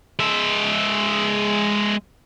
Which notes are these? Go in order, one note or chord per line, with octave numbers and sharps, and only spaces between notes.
G#3 E5